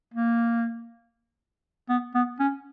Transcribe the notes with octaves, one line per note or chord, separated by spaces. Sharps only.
A#3
B3
B3
C#4